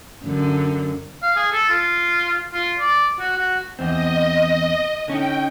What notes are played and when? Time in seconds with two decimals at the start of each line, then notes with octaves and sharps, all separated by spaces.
0.24 F#2 D3
1.22 F5
1.36 G#4
1.52 A4
1.70 F4
2.53 F4
2.79 D5
3.20 F#4
3.38 F#4
3.79 E2 C4 D#5
5.08 D3 C#4 D#4 G5